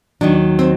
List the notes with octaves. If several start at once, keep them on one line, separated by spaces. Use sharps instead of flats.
D#2 D#3 F#3 D4
C4